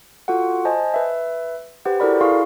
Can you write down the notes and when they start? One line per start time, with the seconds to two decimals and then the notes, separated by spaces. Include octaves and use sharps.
0.28 F4 F#4 A4 F#5
0.65 C5 D#5 G#5 A5
0.94 B4 E5
1.85 G4 B4 C5 F#5
2.00 E4 F#4 A4 A#4 D5 B5
2.21 E4 G#4 F5 C6 C#6